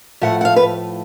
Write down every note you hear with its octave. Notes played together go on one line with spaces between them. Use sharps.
A2 F3 A3 F#5
F#5
F5
B4